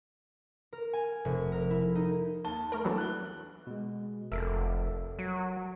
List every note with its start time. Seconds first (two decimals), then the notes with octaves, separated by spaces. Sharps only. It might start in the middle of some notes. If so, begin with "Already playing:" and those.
0.73 A#4
0.93 G#5
1.25 F1
1.52 A#4
1.70 E4
1.95 D#4
2.44 D#2 A5 G7
2.72 A3 A#4
2.85 E3 F#3 B3 D4 A4
2.98 F#6 G7
3.67 B2 G#3
4.32 F1 A4 A#4 E5
5.19 F#3